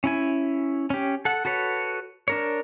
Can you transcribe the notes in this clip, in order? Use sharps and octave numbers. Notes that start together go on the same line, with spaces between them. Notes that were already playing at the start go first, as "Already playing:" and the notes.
C#4 E4 G#5
C#4 G4
A4 F#5
F#4 A4 B4 C#5
D4 A#4 C#5